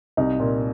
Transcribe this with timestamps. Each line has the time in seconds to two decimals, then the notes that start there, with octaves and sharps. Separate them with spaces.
0.17 C2 D#4
0.40 A#2